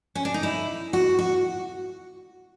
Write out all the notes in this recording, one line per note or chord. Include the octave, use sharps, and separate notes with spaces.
C#4
D4
D#4
E4
F#4
F#4